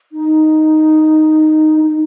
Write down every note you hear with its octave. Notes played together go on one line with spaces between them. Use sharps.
D#4
D#4